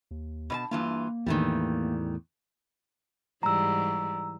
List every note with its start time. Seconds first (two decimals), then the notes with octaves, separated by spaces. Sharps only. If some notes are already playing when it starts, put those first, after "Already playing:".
0.11 D#2
0.50 B2 C#5 A5
0.71 G2 E3 A#3 F4
1.26 E2 A2 D#3 E3 G3
3.43 G#2 E3 G3 A#5 E6